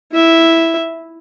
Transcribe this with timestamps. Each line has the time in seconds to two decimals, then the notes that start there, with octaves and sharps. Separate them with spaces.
0.13 E4 E5